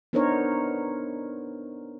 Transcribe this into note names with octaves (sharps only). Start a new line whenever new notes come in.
B3 D4 D#4 A#4 C5 C#5